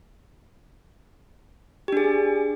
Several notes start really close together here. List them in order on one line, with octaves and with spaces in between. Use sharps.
G4 D4 G#4